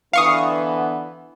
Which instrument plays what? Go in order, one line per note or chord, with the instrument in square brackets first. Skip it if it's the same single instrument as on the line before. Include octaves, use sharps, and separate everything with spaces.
[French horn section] D3 E3 B3 [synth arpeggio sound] F5 C#6 D#6